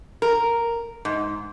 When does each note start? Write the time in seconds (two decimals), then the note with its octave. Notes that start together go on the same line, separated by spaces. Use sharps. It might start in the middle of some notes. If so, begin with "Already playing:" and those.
0.22 A#4
1.05 G#2